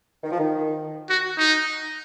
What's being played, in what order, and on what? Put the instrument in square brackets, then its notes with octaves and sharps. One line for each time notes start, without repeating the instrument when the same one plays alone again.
[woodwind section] D#3
F3
D#3
[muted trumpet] F#4
D#4